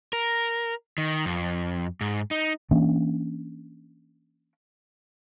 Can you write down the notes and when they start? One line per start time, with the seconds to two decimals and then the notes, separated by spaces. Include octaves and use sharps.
0.13 A#4
0.98 D#3
1.25 F2
2.01 G#2
2.31 D#4
2.71 E3 A#3 C#4 D4